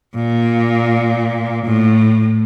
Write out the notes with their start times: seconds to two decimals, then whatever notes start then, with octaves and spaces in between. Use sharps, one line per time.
0.15 A#2
1.66 A2